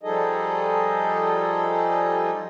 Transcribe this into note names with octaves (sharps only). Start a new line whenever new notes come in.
F3 G3 D#4 G#4 A4 D#5